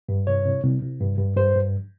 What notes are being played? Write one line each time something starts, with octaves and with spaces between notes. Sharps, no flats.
G2
C2 C#5
C2
C2
C2
G2
G2
G2 C5
G2